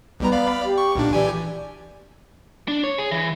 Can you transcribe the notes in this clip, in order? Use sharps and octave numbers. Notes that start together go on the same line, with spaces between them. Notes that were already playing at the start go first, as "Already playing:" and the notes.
B1 G3 B3 A#5
D5 F5 B5
G4
C#6
B1 A#2 D4
E3 G4 D5 G#5
D4
C#5
G#4
E3